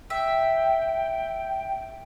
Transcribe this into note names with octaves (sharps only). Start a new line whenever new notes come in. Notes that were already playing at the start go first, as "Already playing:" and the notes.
E5 G5